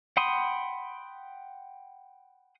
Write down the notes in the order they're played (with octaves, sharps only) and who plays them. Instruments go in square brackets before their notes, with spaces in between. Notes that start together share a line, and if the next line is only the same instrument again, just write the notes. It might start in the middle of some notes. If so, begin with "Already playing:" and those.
[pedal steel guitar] F#5 G5 B5 C6 D#6